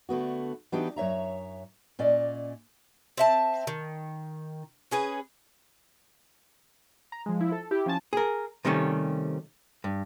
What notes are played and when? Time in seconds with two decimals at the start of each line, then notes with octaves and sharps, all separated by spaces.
0.09 D3 A3 B3 F#4
0.72 E3 B3 D4 D#4 F#4 G4
0.96 F#2 C#5 E5 A#5
1.99 A#2 C#4 D5 D#5
3.18 C4 E5 A5
3.67 D#3
4.91 C#4 G#4 B4
7.12 A#5
7.26 F3 G#3
7.39 F3 E4
7.52 A4
7.71 E4 G4
7.86 F3 C#4 G#5 A5
8.13 G#4 A#4
8.65 C3 D#3 G3 A3 C#4
9.84 G2